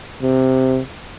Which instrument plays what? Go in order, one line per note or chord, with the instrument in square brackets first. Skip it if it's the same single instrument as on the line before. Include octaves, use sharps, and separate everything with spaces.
[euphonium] C3